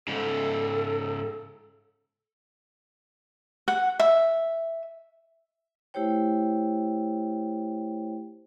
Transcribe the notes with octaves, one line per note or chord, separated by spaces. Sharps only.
G#2 C#3 A4
F#5
E5
A3 E4 G4 C5 C#5 G5